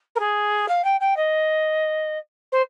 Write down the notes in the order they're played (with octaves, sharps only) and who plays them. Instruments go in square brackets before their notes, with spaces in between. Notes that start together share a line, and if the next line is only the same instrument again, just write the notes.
[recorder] A#4
G#4
F5
G5
G5
D#5
C5